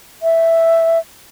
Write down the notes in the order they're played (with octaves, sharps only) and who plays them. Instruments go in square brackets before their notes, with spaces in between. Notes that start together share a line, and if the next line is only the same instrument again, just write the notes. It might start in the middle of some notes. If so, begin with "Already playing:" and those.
[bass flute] E5